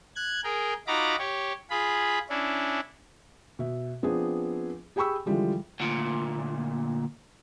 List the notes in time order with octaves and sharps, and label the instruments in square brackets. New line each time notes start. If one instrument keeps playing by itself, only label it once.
[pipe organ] F#6 G#6
G#4 A#4 G5
D#4 F4 F#4 A#5 B5 D6
G4 C#5
F4 G#4 B5
C#4 D4 E4
[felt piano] B2 E5
F3 B3 C4 D4 G#4
G4 G#4 G5 B5 C#6 E6
D3 E3 F3 G3 G#3
[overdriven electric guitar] D2 A#2